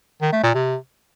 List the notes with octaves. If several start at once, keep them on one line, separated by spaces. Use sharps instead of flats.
D#3
A3
A#2
C3